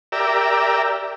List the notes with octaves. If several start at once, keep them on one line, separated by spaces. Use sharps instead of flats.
G4 A#4 D5 E5